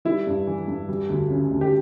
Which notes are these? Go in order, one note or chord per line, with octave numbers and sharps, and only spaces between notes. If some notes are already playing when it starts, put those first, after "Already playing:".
G3 E4
G2
E3
G2
G3
D2
C#3
D2
G4